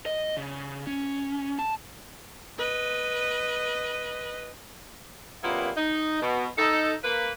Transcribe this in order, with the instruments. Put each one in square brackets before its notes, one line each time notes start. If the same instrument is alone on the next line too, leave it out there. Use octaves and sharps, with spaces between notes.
[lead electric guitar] D#5
C#3
C#4
A5
[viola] B4 D#5
[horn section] A#2 C#3 G3 A#3 B3 E4
D#4
B2
D#4 A4
A#3 B4